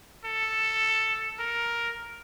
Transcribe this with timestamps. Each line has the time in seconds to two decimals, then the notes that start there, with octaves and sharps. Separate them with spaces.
0.25 A4
1.39 A#4